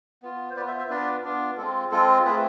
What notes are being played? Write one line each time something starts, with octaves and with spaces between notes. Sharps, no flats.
B3 F4
C5
B3 F4 B4 D5
C5 E5
C5 E5
B3 D4 F4 B4 D5
B3 D4 F4
G#3 C4 F4 A4
G#3 C4 F4 A4
A3 C4 F4 G#4 B4